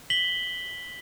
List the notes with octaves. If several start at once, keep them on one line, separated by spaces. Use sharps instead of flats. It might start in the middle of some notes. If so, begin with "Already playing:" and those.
B6 F#7 G7